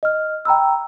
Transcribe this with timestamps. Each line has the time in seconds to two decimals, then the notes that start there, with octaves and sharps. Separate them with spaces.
0.03 D#5 F6
0.45 G5 A#5 B5 E6